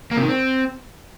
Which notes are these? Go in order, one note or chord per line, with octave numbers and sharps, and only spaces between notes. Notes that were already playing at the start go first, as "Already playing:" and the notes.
A#3
C3
D#3
C4